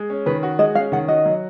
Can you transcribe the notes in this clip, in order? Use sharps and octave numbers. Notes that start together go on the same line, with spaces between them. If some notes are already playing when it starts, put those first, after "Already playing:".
Already playing: G#3
C#4
D#3 B4
F#4
G#3 D#5
C#4 F5
D#3 F#5
F#4 D#5
F#3